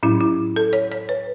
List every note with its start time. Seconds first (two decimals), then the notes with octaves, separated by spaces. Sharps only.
0.03 A2 F#3 C#4 E4
0.21 E4
0.56 A4
0.73 C#5
0.92 C#5
1.09 B4